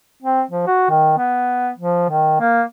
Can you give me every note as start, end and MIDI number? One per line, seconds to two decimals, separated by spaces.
0.22 0.42 60
0.51 0.66 53
0.67 0.87 66
0.90 1.17 51
1.18 1.70 59
1.78 2.07 53
2.09 2.39 51
2.40 2.62 58